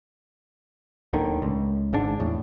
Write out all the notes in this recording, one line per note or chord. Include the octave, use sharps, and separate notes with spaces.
D1 D#2 D3 D#3
C#2
G#1 G#2 D4
E2 A2